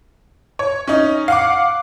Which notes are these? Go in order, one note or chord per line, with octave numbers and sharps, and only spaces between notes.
C#5
C#4 D#4
F5 F#5 D6